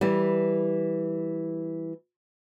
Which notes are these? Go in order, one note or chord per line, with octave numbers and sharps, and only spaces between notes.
E3 G3